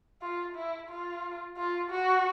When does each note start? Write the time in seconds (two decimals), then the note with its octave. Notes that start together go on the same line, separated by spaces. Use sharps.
0.22 F4
0.56 E4
0.89 F4
1.57 F4
1.90 F#4